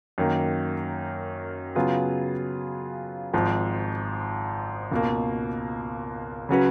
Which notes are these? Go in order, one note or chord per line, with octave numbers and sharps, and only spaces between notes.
F#2 D#3 A#3
C#3 F#3 B3 F4 G#4
G#1 G#2 F3
C#2 B2 A#3
C#3 F#3 C#4 F#4 B4